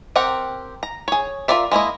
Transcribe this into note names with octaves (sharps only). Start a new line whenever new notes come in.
C4 G4 A#4 F#5
A#5
G#4 C#5
F4 A4 A#4 D5 E5
G#3 A#3 E4 D#5